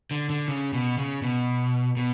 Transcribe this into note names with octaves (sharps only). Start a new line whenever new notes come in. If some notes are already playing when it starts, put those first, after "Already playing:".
D3
D3
C#3
B2
C#3
B2
B2